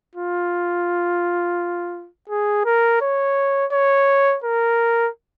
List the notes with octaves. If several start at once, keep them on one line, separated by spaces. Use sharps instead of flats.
F4
G#4
A#4
C#5
C#5
A#4